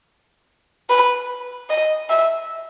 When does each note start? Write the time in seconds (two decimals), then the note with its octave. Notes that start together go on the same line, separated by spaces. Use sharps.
0.90 B4
1.70 D#5
2.10 E5